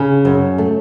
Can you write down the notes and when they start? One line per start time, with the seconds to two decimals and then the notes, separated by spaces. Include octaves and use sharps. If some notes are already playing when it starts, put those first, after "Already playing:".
Already playing: C#3
0.25 F#2
0.58 A3